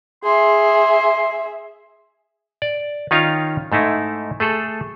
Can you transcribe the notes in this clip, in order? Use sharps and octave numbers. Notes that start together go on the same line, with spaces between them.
G#4 E5 C6
D5
D#3 C#4 D#4 F4 C#5 F5
G#2 A3 D#4 E4
A3 G#4 A4